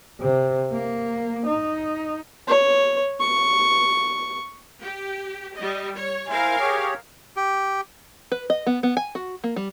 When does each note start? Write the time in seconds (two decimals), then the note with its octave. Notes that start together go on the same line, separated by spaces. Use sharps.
0.21 C3
0.72 A#3
1.46 D#4
2.47 C#5
3.20 C#6
4.84 G4
5.55 G3 D#5
5.94 C#5
6.29 E4 A#4 C5 F5 G#5
6.60 G4 G#4 C#5
7.36 G4
8.32 B4
8.50 D#5
8.67 B3
8.83 B3
8.97 G#5
9.15 F#4
9.44 A#3
9.56 G3